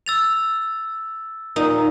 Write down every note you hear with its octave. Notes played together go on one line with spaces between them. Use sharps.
E6 A6 F7
A#2 D#4